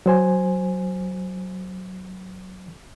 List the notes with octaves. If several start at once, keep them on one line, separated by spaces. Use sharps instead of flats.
F#3 C5 G#5